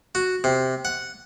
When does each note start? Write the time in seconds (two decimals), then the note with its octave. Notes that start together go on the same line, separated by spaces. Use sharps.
0.15 F#4
0.44 C3
0.85 F#5